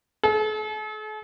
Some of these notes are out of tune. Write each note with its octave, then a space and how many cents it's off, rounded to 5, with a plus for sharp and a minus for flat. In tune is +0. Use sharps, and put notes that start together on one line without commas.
A4 -45